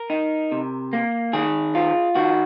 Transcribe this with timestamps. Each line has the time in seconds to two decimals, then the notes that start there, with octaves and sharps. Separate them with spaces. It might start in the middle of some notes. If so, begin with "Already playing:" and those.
Already playing: A#4
0.10 D#4
0.52 C3
0.93 A#3
1.33 D#3 G#4
1.75 F4
2.15 D#3 F#4